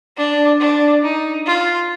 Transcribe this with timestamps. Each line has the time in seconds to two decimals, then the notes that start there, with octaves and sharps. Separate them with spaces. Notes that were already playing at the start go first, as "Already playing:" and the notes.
0.17 D4
0.59 D4
1.03 D#4
1.46 F4